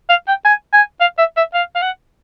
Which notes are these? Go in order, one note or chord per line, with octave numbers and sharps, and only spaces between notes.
F5
G5
G#5
G#5
F5
E5
E5
F5
F5
F#5